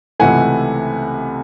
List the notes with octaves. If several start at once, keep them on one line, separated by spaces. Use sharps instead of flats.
C#2 C3 E3 A3 F#5 G#5